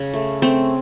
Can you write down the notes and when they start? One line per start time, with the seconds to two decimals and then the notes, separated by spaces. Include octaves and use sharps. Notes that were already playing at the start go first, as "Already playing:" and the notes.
Already playing: C#3
0.14 A3
0.42 A3 C4